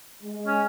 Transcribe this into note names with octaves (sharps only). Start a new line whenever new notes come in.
G#3
C#4